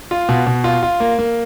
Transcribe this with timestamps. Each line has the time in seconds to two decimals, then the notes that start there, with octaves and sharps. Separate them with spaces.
0.11 F4
0.29 B2
0.47 B2
0.64 F4
0.83 F4
1.00 A#3
1.19 A#3